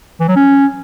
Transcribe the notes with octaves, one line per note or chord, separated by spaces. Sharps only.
E3
F#3
C#4